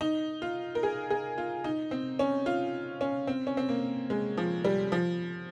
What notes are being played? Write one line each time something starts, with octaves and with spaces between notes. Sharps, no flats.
D#4
F4
A#4
G#4
G#4
F4
D#4
C4
C#4
F4
C#4
C4
C#4
C4
A#3
G#3
F3
G3
F3